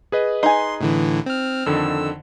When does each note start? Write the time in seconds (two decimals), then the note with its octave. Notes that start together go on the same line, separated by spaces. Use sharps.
0.12 G#4 B4 D#5
0.43 D#4 G#5 C6
0.81 A2 D3 E3
1.26 C4 F6
1.66 F2 D3 D#3 E6